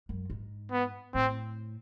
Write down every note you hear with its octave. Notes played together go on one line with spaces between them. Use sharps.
F#2
G#2
B3
A2 C4